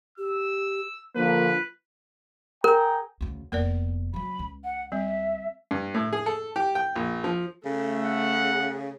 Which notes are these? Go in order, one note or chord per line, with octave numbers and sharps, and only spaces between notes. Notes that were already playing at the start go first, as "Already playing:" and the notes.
G4 E6
D3 F3 A#3 F4 B4
G#4 A#4 G5 A#5
D2 C#3
F1 A#3 B3 A#4 D5
C#3 F#3 B5
C#2
F#5
G3 C4 E5
G2
A2
G#4
A4
G4
G5
A#1
F3
C#3 A3
F#5